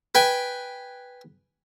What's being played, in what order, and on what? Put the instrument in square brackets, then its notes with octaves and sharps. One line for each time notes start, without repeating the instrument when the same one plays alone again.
[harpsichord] B4 G5 G#5